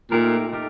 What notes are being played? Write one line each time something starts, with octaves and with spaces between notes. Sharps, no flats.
A#2 A3 D#4 G4 A#4
A3 D#4 G4 A#4